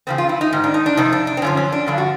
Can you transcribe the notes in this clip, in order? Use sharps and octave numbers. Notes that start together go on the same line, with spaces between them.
E2 C#3 F3 C4
F4
E4
D#4
G#2 D#3
D4
D#4
D4
F2 C3 D#4
D4
D4
C4
F#2 D3 F3 C#4
C#4
D4
G2 D3 F3 D4
F#4